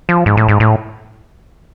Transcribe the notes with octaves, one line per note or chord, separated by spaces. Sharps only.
F3
G#2
A2
G#2
A2